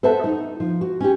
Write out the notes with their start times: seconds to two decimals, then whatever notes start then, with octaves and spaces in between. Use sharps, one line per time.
0.03 A4 B4 C5 E5 F#5 A5
0.24 D#4
0.60 F3
0.81 F#4
1.00 C#4 G4